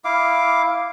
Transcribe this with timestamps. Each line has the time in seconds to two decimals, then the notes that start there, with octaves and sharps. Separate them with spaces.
0.05 E4 F5 D6